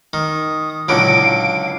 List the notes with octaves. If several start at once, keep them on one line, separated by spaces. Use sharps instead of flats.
D#3 D#6
C#2 A#2 D3 F#3 E4 D7
F5